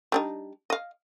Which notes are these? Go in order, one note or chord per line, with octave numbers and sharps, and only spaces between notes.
G3 D4 D#4
D#5 F5